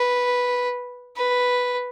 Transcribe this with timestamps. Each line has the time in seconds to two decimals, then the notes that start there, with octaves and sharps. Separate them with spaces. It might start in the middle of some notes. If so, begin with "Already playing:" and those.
Already playing: B4
1.17 B4